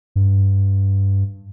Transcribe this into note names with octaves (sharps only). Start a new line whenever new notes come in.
G2